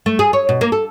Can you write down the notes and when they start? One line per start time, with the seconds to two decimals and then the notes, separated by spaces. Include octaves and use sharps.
0.06 A3
0.19 G#4
0.33 C#5
0.49 B2
0.61 A#3
0.72 A4